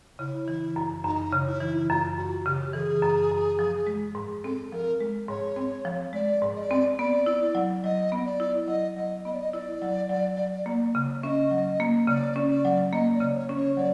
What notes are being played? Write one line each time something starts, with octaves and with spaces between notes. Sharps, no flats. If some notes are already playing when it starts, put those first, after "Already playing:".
C#3 E4
E3
F#2
F#2 D#4
C#3
E4
E3
E4
F#2 F4
F#2 F#4
C#3 G4
E3 G#4 A4
F#2
F#2
F3
G#3
G#2
C4 A4
F3 A#4
G#3
G#2 C#5
C4
F3
G#3 D5
G#2
D#5
D5
C4
B3 D5
E4
F#3
F#3 D#5
B3
D5
E4
F#3 D#5
F#3 D#5
B3 D#5
D5
D#5
E4 D5
F#3
F#3
F#3
A#3
C#3
C#4 D#5 E5
F#3
A#3
C#3 D5
C#4
D5
F#3
A#3 D#5
D5
C#3
C#5
C#4
C#5
F#3 D5